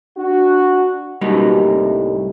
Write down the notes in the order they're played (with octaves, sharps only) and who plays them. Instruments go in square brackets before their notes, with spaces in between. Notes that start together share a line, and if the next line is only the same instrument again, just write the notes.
[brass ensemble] D4 F#4
[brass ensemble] F#1 B2 F#4 [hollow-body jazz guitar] G3 A#3 D#4
[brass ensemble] C2 A2